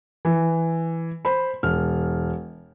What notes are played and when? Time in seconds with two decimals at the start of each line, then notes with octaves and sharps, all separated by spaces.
0.25 E3
1.25 C5 B5
1.63 E1 F6